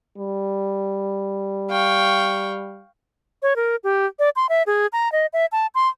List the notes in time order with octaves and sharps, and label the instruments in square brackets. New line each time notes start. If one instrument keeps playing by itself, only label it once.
[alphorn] G3
[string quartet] F5 G5 C#6
[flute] C#5
A#4
G4
D5
C6
E5
G#4
A#5
D#5
E5
A5
C6